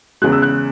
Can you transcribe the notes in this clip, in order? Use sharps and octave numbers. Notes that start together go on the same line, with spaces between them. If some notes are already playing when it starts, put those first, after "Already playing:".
E2 C#3 G#3 F#6
E6
F#6